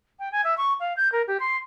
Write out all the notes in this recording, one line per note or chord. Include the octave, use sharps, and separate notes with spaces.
G5
G#5
E5
C#6
F5
G6
A#4
G4
C6